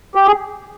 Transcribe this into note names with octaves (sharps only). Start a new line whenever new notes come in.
G4
G#4